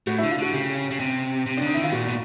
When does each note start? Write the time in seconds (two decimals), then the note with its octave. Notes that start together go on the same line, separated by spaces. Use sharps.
0.07 A2 F#4
0.18 E4
0.23 D3
0.30 F4
0.38 D3 F#4
0.53 C#3 G4
0.91 C#3
1.00 C3
1.46 C3
1.57 D4
1.62 D3 D#4
1.74 D#3 E4
1.83 F4
1.92 A#2 F#4
2.07 B2